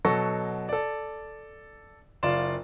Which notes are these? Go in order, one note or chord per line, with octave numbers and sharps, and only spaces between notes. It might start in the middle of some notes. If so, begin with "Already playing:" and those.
B2 F#3 A4 C#6 A#6
A4 D5
F#1 F4 D5 C6 E7